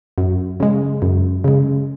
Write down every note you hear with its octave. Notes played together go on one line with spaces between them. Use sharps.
F#2
C#3 G#3
F#2
C#3 G#3